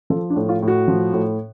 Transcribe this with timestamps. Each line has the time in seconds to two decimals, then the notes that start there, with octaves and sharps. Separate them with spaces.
0.10 F3 A4
0.30 D4
0.36 A2
0.49 F4
0.62 A2
0.68 F#4
0.88 F3
1.13 A2